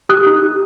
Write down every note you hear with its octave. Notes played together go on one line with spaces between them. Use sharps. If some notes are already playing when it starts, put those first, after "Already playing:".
G4 D#6 F#6
D#4
G4